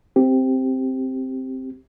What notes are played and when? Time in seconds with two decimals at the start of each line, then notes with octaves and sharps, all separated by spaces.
0.16 C4 G4